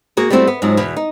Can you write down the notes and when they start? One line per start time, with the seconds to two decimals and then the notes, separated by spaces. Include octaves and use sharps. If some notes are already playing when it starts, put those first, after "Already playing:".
0.17 A#3 F#4 G#4 A#4
0.30 G3 A3 B3 C4 E4 F#4
0.47 B3
0.62 F2 G#2 F3 F#3
0.77 E2 B2
0.96 D#4